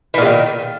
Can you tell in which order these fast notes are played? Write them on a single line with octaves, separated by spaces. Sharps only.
E3 A#2 G#3 D#3